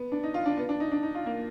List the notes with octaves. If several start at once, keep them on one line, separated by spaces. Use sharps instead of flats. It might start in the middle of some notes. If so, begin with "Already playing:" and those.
Already playing: B3
D4
D#4
F4
D4
B3
D4
D#4
D4
D#4
F4
A#3